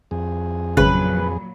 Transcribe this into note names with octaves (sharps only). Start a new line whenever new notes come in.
F2 G#4
G#1 A#2 C#3 F#3 B4